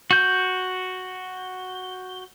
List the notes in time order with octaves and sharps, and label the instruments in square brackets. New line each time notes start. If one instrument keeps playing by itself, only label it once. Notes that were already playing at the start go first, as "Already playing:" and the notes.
[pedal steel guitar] F#4 G6